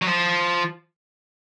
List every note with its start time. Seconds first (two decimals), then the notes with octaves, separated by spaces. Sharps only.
0.02 F#3
0.07 F3